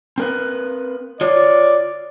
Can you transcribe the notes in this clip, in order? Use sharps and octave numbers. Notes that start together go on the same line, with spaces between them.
C4 A#4 B4
F4 C#5 D5